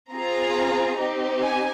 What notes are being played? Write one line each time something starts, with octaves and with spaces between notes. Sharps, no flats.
C4 F4 G#4 A#5
C4 D#4 G4
G#5